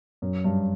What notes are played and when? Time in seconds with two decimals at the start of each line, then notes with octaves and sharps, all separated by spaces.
0.22 F#2
0.44 G2